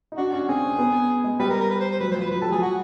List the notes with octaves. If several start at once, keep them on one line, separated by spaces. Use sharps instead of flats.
D#4
D4 F#4
C#4 F#4
C4 G#4
B3
G#3
G3 B4
A#4
A#4
B4
C5
C5
F#3 B4
F#3 C5
F3 B4
F#3 B4
G3 A4
F#3 G#4
F#4